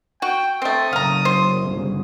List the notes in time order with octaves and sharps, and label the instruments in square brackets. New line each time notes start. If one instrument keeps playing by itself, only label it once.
[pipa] F#4 [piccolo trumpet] G5
[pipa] A3 C4 [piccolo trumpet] D#6
[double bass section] F#1 [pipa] F5 A#5
[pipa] C5
[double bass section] G1 C#3